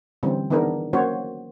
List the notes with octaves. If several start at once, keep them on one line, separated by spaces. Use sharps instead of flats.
D3 E3 G3 C4 C#4
D#3 E3 B3 D4 G#4 A#4
F#3 A#3 C#4 F#4 C5 C#5